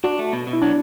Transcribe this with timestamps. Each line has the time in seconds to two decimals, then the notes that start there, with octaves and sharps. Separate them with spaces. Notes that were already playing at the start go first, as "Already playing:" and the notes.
0.04 D4 F#4
0.19 A3
0.33 B2
0.47 B2
0.53 E4
0.62 F#3 D4